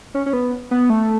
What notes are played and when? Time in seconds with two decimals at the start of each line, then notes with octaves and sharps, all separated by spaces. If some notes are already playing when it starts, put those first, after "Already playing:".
0.15 C#4
0.26 C#4
0.33 B3
0.71 B3
0.90 A3